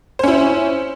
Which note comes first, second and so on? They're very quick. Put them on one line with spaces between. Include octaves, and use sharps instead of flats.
C5 C#4 E4